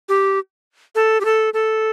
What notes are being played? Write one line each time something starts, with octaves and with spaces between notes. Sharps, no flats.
G4
A4
G4
A4
A4